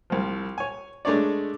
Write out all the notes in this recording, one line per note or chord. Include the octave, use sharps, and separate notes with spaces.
C2 F3
C#5 G#5
G#3 A3 D4 C#5 D5